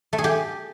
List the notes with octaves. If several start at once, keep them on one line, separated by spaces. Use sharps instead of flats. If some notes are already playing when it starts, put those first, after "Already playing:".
A3
G#4
G4